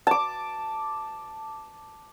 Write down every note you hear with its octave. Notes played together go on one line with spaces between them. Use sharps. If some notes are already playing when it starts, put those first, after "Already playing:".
A5 D6